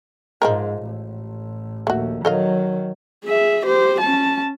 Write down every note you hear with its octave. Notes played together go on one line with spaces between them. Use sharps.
G#2 F3 G#3 A#4
A1
A#1 D#2 A3 F#4
D#3 F#3 A4 D#5 F5
G#4 E5
G4 C5
C#4 A5